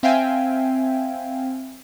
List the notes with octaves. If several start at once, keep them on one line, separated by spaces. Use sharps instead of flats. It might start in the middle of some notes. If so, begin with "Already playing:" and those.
C4 E5 F5 G5 G#5